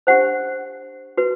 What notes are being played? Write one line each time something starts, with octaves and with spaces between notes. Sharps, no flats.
D4 G4 C5 F#5
F#4 B4